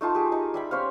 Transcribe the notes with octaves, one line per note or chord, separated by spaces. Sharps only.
A3 D#4 F4 A5
G4 G#4
D#4 A#5
G3 E5 B5
C#4 C5 C#5 F5